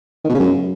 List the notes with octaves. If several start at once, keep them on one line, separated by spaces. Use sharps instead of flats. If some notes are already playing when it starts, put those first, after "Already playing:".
D#3
B2
C#3
F#2